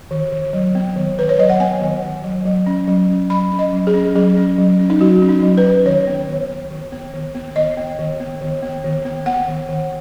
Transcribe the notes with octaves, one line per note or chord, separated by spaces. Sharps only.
D#3
D#3
F#3
B3
D#3
D#3 B4
C#5
F#3 D#5
F#5
B3 G#5
D#3
D#3
F#3
F#3
C#4
F#3
C#4
F#3 B5
C#4
D#5
F#3
G#4
C#4
F#3 G#4
C#4
F#3
C#4
D#4
F#3 F#4
C#4
D#4
F#3
B4
C#4
D#3 C#5
B3
D#3
B3
D#3
B3
D#3
B3
D#3 D#5
B3
D#3
B3
D#3
B3
D#3
B3
B3 F#5
D#3
D#3